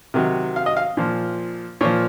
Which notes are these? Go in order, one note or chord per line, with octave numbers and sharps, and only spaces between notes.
C3 D#3 F#3
F5
D#5
F5
A#2 F3
A#2 F3 C#5